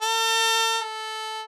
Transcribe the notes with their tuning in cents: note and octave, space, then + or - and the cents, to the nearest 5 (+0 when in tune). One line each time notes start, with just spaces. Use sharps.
A4 +45
A4 -10